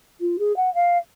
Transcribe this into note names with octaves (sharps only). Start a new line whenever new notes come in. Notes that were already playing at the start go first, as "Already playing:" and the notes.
F4
G#4
F#5
F5